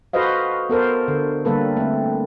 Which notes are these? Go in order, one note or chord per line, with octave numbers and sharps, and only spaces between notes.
F#4 A4 B4 C5 D#5 F5
B3 A4 A#4 C5
D3
D3 G3 A#3 A4 B4
A3 C4